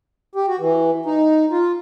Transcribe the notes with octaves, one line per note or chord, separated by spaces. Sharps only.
G4
F#4
E3
D#4
F4